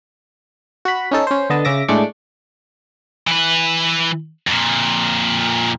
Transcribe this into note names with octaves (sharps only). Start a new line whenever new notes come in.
F#4 B5
C#4 D#4 A4
C#4 C5
D3 B3 D#5 A5
C#3 E5 D6 A#6
A2 G#3 A3 D4 C#6 D6
E3 B4
F2 A#2